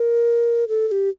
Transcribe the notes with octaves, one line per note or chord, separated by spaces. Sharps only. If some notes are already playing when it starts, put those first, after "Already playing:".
Already playing: A#4
A4
A4
G4